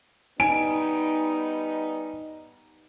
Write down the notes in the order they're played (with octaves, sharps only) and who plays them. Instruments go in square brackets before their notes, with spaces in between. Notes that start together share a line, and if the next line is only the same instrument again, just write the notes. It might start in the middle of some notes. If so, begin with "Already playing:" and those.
[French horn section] G3 B3 D#4 [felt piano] G#5 D7